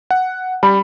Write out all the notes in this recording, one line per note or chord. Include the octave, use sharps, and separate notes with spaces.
F#5
G3 B5